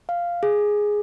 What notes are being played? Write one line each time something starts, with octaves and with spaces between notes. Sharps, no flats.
F5
G#4